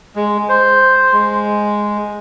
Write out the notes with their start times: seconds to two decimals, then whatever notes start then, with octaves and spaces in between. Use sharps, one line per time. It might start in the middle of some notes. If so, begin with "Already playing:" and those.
0.16 G#3
0.49 C5
1.13 G#3